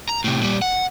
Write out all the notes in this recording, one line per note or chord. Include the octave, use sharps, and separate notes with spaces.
A#5
A2 C3
A#2 G3
F#5